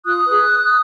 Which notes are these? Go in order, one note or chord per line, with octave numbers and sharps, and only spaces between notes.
F4 D#6 F#6
G#4 B4